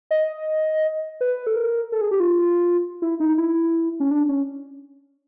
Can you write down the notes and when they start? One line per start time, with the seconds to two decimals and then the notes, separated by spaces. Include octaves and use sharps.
0.11 D#5
1.21 B4
1.47 A4
1.56 A#4
1.92 A4
2.01 G#4
2.11 G4
2.20 F4
3.02 E4
3.20 D#4
3.38 E4
4.00 C#4
4.11 D4
4.29 C#4